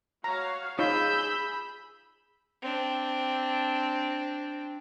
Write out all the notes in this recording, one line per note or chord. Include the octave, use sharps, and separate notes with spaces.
F#4 C#5 F5 A#5
D#4 F4 G#4 C#5 B5 E6 G6
C4 D4